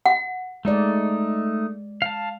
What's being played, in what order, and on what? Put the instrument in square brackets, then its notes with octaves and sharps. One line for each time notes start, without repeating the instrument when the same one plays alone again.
[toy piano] F#5
[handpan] G#3 D5 [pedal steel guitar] A3 D#4
[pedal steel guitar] F5 A5